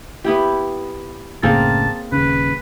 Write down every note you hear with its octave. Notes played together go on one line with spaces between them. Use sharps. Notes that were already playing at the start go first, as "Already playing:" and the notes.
B3 E4 G4
F#1 A2 C#3 A#3 C4 G#4 A5
D#1 C#3 B4